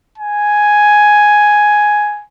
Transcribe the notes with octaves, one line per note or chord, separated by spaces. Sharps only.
G#5